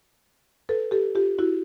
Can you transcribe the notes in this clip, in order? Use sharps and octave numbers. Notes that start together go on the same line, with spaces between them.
A4 B4
G4 A4
F4 G4
E4 F#4